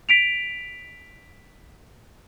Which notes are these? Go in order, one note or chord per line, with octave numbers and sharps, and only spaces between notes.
B6 D7 F7